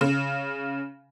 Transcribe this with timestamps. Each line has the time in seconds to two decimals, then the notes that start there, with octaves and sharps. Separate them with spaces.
0.01 C#3